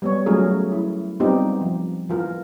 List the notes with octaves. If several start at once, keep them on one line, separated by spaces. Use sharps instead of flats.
G3 B3 C#5
F#3 A3 C#4 F4 G#4 A#4
E4
G3 B3 C4 D#4 F4 G4
F3
E3 F4 A#4